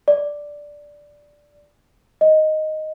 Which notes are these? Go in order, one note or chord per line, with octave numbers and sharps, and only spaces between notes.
D5
D#5